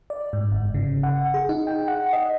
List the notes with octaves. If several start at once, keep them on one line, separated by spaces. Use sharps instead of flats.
D5
G#2
G1
C#3
F#5
G#4
D#4
G5
F#5
D#5